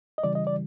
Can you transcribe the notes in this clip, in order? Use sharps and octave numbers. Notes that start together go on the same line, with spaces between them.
D#5
C#3 E3 G3 D5
D#5
D5